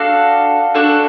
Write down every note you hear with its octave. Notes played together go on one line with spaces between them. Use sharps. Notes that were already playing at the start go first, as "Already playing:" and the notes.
Already playing: D4 F#4 A4 F5
D4 F#4 A4